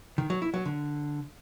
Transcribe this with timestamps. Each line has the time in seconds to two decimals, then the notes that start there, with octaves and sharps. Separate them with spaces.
0.18 D#3
0.30 F#3
0.42 E4
0.54 F#3
0.65 D3